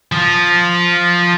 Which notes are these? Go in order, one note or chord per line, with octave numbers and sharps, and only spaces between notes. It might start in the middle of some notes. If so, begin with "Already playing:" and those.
F3 F4